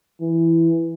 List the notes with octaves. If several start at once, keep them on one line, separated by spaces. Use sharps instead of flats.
E3